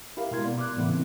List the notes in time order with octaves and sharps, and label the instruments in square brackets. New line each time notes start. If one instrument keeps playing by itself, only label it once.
[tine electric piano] E4 G4 A#4 F5
B2 G#3 A#4 C6 G#6
B3 D5
D6 F#6
A2 C#3 E3 A3 B3 E4
C4